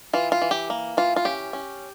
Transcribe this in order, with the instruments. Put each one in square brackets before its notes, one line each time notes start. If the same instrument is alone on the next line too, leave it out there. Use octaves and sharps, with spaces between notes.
[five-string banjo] E3 F4
F4
E3
G4
A#3
E3 F4
F4
C#4 G4
C#4